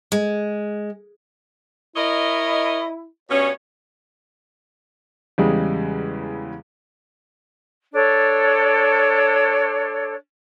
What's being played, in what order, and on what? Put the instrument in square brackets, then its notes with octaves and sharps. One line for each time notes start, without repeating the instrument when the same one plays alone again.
[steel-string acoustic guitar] G#3
[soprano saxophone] E4 [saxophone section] A#4 C#5 D#5
[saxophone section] G2 B2 C#4 [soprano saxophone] C#5
[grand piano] E2 C#3 G3 G#3
[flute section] D4 A4 C#5